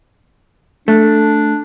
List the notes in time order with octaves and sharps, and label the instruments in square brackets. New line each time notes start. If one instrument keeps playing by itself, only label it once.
[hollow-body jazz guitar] A3 [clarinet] D4